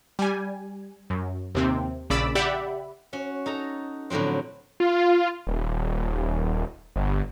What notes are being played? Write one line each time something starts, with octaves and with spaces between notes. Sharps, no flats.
G3 G#5
F#2
D#2 C3 C4
A#1 C#3 D5 B5 D6 E6
G4 D5 E5 F#5 B5
C#4 F#4
D#4 A4 A#5
A2 D3 F3 F#3 C4
F4
D#1
G1